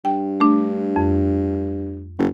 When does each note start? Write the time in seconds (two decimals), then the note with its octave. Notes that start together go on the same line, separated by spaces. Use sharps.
0.05 G2 G5
0.40 A3 D4
0.96 F2
2.19 F#1